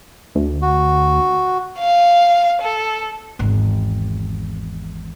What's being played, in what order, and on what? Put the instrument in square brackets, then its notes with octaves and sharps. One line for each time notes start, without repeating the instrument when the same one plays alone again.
[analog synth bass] D2
[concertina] F#4
[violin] F5
A4
[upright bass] G#1 E2